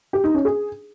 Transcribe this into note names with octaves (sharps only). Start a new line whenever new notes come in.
G4
D#4
C#4
G#4